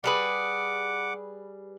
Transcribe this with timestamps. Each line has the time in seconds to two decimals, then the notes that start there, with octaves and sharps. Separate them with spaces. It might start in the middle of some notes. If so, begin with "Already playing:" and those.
0.04 G3 G#4 B4 F#5 D6